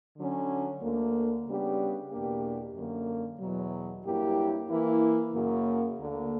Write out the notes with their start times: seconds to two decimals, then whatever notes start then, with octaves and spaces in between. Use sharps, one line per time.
0.16 D3 F#3 C#4
0.81 D2 D3 A#3
1.46 C#3 G3 B3 D4 G4
2.10 E2 B2 A#3 D4 G4
2.75 F#2 D3 A#3
3.40 E2 B2 F#3
4.04 G2 F#3 A#3 E4 G4
4.69 E3 A#3 E4
5.33 F#2 C#3 F#3 A#3
5.99 D2 D3 A#3